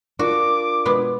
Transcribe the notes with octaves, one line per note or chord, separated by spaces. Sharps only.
D4 F4 F#4 A#4 D6
B2 G#3 B3